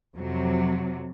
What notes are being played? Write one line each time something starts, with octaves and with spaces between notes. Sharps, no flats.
F2 C3 F#3